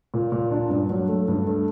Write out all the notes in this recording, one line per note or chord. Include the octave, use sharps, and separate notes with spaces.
A#2
A#2
D4
G2
F#3
A3
G2
A3